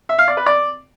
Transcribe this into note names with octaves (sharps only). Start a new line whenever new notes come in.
E5
F5
D5
B4
D5